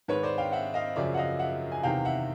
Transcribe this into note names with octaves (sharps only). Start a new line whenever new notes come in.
G#2 D#3 B4 C#5
C5 D5
F5 G5
E5 F#5
D#5 F5
F#2 C#3 F3 D5 E5
F#5
D#5 F5
E5 F#5
G#5
E2 C3 D#3 F5 G5
E5 F#5